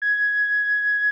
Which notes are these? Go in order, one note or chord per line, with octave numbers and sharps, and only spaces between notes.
G#6